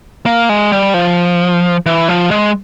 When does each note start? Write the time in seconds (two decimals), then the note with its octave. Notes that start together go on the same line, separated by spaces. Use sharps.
0.26 A#3
0.49 G#3
0.72 G3
0.94 F3
1.86 E3
2.09 F3
2.31 G#3